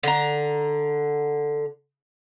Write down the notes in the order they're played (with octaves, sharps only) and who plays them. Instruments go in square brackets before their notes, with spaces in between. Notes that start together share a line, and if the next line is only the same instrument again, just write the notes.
[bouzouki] D3 A#5